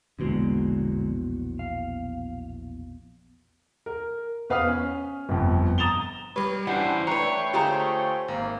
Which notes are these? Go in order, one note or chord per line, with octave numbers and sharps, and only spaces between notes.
A#1 E2 B2 D3 F#3 G#3
F5
A#4
E2 B4 F5 D#6 F6
C#4
G1 F2
A#5 D#6 A6 E7 F7 G7
G3 B4 C#5
E3 G3 C#4 D4 C5 F#5 B6
A3 D4 B4 C#5 G5 A#5 C7
D3 F4 G4 G#4 C5 A#5
G#1 A#3